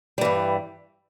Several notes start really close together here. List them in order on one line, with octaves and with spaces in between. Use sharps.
G3 E3 G2